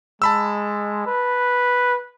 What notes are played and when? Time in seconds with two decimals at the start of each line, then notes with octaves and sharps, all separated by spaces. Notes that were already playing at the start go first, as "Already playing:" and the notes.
0.22 G#3 A5 B5 E6
1.07 B4